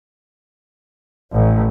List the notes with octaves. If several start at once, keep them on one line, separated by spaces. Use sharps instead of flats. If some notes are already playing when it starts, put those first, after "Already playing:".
A1